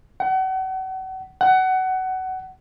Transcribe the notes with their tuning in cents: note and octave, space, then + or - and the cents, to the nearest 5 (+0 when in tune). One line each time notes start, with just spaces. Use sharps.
F#5 +35
F#5 +20